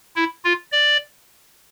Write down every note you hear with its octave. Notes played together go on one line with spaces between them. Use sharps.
E4
F4
D5